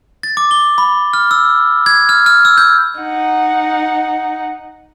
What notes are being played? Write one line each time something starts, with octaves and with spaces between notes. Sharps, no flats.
A6
D6
G7
B5
F6
E6
G#6
F6
F6
E6
G6
D#4 F#5